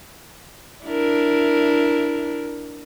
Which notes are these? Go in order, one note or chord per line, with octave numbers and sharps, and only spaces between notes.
D4 E4 A#4